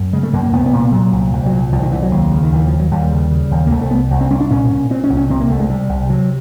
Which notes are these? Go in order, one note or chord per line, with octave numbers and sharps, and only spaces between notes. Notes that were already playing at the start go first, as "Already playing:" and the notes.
Already playing: F#2
C#3 G#3
A3
F#2 A#3
A#3
C2 B3
B3
A#2
B3
A#2 F#3
C2
C2
F#3
A#2
C2 F3
D#3
C2 E3
F#3
D#2
C#3
D#3
D#2 E3
D#2 F3
F#3
D#2 G3
C#3
C#3
D#2
A#3
C2 A3
A3
C2 B3
C2
C4
C2 C#4
D4
A#2 C#4
A#2
A#2 C4
C#4
C2
C#4
C3 C4
A#3
C2 A3
G#3
C3 G3
C2
C3 F#3